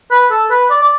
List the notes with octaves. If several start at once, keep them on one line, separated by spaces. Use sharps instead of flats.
B4
A4
B4
D5
D5